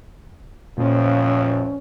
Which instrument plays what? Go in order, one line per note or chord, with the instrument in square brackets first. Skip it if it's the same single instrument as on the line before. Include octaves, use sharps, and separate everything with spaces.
[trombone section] A1 F2 F3 [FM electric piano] A#2 [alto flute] C#4